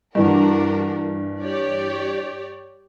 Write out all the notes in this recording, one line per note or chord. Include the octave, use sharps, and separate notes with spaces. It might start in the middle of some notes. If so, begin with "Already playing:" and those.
G2 E3 D4 F#4 A#4
G4 C#5 D5